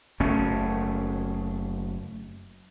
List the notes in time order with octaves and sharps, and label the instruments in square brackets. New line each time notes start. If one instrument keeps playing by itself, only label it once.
[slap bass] F#1 A3 C#4